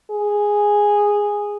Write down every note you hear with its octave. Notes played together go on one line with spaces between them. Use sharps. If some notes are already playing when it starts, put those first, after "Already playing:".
G#4